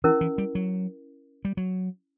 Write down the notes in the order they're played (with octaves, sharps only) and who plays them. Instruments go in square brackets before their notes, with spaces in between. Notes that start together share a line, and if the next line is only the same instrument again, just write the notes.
[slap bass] E3 [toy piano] C#4 E4 A#4
[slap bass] E3
G3
F#3
G3
F#3